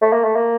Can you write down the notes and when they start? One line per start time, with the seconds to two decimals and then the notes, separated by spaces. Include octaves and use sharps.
0.02 A3
0.13 A#3
0.24 A3
0.36 A#3